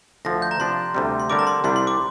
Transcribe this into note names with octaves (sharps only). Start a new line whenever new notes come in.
D2 D3 F3 A#6
G6
A#5
C3 F3 D4 C6
D2 C3 G3
C6
D3 G3 C4 A#4 D5 D6
A#5
C6
C2 C3 G3 D4 C6
C6
D6